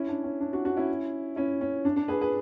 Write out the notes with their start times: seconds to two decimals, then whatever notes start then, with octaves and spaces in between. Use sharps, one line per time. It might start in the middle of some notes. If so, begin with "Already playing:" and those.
Already playing: C#4 E4
0.08 D4
0.24 C#4
0.40 D4
0.53 D4 F#4
0.65 D4 F#4
0.77 C#4 E4
1.36 C#4 E4
1.61 C#4
1.85 D4
1.96 D4
2.08 G#4 B4
2.21 G#4 B4